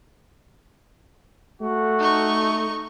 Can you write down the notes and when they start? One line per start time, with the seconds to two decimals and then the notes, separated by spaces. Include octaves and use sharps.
1.61 A3 F#4
1.99 D#4 C#6